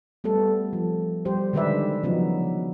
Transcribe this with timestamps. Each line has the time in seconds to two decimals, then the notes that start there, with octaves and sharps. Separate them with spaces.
0.24 G3 A3 B3 A4
0.73 F3
1.25 G3 G4 C5
1.53 D3 D#3 G#3 B4 D5 E5
2.03 C#3 F3 F#3 B3 D#4